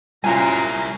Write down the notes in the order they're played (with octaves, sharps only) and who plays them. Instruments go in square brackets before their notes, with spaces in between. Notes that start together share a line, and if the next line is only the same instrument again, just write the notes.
[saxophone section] F#2 A#2 [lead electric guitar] G3 E4 [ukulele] G#5 [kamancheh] A#5